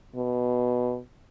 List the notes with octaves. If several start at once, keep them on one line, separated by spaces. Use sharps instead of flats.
B2